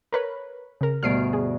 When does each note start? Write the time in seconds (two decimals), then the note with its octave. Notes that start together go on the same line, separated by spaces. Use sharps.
0.13 A#4 B4 C#5
0.81 C#3 A#4
1.03 D2 G2 B2 F6 C7 D7
1.33 G#4